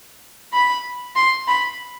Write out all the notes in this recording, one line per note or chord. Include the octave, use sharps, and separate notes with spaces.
B5
C6
B5